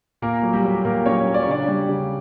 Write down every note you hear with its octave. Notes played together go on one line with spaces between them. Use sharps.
A#2 A#3 A#4
F#3
G3 G4
F#3
A#2 A#3 A#4
F#3 C#4 C#5
F#3
D5
C#5
C#3 D4 D5
G3
C#3